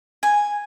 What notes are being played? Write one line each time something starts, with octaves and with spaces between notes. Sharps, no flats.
G#5